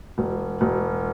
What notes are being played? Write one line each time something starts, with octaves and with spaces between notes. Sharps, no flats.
E1
E1